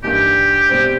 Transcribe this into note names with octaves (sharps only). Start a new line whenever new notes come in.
G2 E3 G3 A#3 D#4 G4
B2 G3 C4